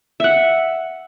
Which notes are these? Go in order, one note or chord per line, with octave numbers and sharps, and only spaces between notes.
E5 F#5